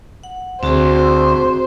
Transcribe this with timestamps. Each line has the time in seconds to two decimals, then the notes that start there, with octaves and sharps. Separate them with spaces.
0.23 F#5
0.63 D2 C4 F#4 G#4 C5